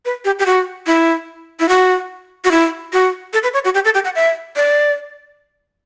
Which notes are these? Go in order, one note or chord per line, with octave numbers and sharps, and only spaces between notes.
B4
G4
G4
F#4
E4
E4
F#4
F#4
E4
F#4
A4
B4
C#5
F#4
G4
A4
G4
F#5
E5
D5